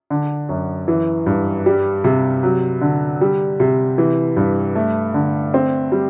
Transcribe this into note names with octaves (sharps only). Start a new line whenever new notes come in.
D3
F#2
E3
G2
G3
C3
F#3
D3
G3
C3
E3
G2
A3
D3
C4
G3